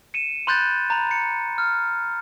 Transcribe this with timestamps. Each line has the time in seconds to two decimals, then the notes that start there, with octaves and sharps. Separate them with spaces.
0.14 C#7 D#7 E7
0.47 B5 C6 F#6 G6 A6
0.90 A#5 B5
1.11 C#7
1.58 F6